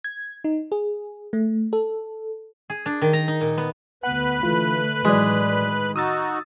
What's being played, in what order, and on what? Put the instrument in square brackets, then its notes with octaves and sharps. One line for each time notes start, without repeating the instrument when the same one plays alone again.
[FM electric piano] G#6
D#4
G#4
A3
A4
[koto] G#4
D4
D#3
A#5
D#4
A#2
B3
[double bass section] D2 B3 [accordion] B4 B5 [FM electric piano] F#5
[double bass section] D3 A3 [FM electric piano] E3 F4
[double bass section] A2 D#3 [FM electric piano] E3 F#3 D5 [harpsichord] G#3
[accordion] D#4 F#4 [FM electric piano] D#6 E6 A6